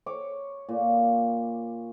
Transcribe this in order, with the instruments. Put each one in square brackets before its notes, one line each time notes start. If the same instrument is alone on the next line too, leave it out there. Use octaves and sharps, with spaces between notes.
[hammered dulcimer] C#5 D6
A#2